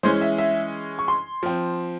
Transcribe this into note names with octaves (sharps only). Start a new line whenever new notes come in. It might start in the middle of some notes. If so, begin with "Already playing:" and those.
E3 G#3 C#4 C5
E5
E5
C#6
C6
F3 C4